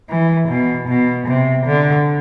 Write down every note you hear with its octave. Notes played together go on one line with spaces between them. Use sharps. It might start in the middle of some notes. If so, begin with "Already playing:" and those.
E3
B2
B2
C3
D3